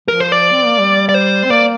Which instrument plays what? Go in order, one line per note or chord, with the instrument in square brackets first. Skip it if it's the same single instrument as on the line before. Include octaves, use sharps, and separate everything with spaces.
[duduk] F3 [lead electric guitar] A#4
[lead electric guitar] C5
D5
[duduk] C4
A#3
G3
[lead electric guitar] D5
C5
[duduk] C4
[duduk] A#3 [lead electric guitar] D5